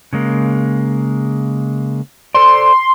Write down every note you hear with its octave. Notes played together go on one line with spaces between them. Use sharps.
C#3 G#3 A#3
A4 C5 D5 C6